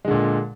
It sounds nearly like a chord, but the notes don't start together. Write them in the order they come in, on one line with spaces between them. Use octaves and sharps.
G#3 D3 A#2